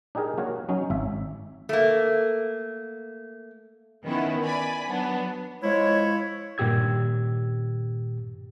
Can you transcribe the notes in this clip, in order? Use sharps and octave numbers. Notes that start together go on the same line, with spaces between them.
D4 D#4 G4 G#4 A#4
A#3 F#4 A#4 C#5
F#3 C#4 D#4
G#1 E5
A3 A#3
D#3 B3 C#4 E4
D5 G#5 B5
F#3 B3 D4
F3 G#3 E4 C#5
G2 A#2 D#3 G4 E6 G#6